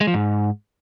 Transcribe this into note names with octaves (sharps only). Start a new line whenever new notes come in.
G#3
F3
G#2